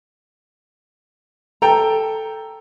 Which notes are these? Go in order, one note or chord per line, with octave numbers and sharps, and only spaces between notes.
A4 G5 A#5